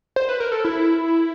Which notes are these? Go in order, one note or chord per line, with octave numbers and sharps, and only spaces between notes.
C5
B4
A#4
A4
E4